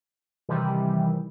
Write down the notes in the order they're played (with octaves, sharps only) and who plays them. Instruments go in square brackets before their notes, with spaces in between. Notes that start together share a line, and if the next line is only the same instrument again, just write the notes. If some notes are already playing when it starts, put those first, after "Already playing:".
[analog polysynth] C3 D#3 E3 G3